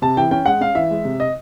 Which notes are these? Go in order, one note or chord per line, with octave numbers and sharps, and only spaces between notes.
C3 A5
E3 G5
C#4 G5
G#3 F#5
C#4 F5
E3 E5
G#3
C3
D#5